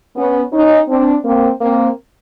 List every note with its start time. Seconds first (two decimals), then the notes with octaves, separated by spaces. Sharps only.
0.15 B3 C#4
0.53 C#4 D#4
0.88 C4 D4
1.24 A#3 C4
1.61 A#3 C4